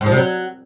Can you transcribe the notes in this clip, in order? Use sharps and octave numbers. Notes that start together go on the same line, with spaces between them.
G#2
F3
C3
F#3